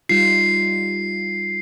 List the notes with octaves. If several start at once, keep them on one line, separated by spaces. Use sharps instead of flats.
G3 D#4 F4 C7